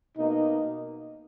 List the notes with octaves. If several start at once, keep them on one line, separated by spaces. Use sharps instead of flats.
B2 A#3 D#4